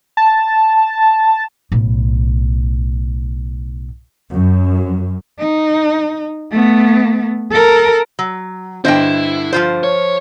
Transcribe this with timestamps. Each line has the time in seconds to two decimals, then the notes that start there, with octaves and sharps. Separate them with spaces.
0.17 A5
1.72 B1 A2
4.30 F#2
5.39 D#4
6.52 A3 B3
7.51 A4 A#4
8.19 F#3
8.85 G2 D3 E4 C5 D#5 G5
9.53 F3 F4 C5
9.84 C#5